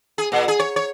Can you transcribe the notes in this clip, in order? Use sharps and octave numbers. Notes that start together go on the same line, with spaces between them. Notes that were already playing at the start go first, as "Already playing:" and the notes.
G#4
A#2
G#4
C#5
C#5